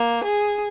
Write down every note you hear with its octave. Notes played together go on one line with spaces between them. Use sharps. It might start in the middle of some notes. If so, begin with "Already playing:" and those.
Already playing: A#3
G#4